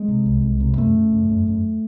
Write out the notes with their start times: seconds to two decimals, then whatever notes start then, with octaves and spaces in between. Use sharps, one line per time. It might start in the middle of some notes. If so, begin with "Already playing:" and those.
Already playing: G#3
0.08 C3
0.26 C2
0.43 C2
0.60 C3
0.77 F#2 A3
0.95 C#3
1.13 F#2
1.29 F#2
1.48 F#2